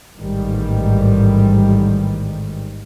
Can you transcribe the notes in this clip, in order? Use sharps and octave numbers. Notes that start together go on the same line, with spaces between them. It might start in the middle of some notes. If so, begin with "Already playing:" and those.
A1 G#2 D#3 G3